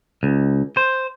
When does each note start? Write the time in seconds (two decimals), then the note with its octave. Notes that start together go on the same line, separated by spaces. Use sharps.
0.23 C#2
0.77 C5